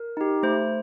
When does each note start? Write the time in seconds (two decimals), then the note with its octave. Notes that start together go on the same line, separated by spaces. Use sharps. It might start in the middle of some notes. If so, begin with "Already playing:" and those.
Already playing: A#4
0.17 D#4 G4
0.43 A3 C5